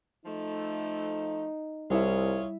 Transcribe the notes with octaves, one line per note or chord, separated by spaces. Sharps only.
F3 A3 D#4
C2 G3 E4 F4 G#4 C#5 E5